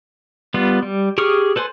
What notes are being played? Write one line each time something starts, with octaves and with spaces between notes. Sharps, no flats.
G3 B3 F4
G3
G4 G#4 C#6 D#6 F6
A4 B4 C5 G#5 C6